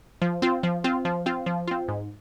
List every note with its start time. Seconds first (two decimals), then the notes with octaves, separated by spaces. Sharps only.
0.22 F3
0.42 C4 F4
0.63 F3
0.84 C4 F4
1.05 F3
1.26 C4 F4
1.46 F3
1.68 C4 F4
1.88 G#2